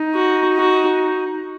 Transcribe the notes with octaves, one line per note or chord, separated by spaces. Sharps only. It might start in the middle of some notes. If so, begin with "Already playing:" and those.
Already playing: D#4
F#4
F#4